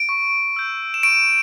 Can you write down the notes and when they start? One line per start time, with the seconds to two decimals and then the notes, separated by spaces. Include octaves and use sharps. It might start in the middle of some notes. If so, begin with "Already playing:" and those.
Already playing: D7
0.09 C#6
0.56 E6 G6
0.94 E7
1.03 C#6 D7